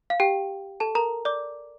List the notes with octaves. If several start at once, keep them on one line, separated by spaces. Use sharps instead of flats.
F5
G4 G5
A4 A5
A#4 A#5
D5 D6